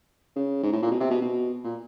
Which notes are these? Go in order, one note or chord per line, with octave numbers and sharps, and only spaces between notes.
C#3
G#2
A2
A#2
B2
C3
B2
B2
A#2